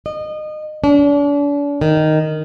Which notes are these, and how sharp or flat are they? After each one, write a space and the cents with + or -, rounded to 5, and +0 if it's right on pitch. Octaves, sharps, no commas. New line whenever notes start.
D#5 -25
D4 -40
D#3 -5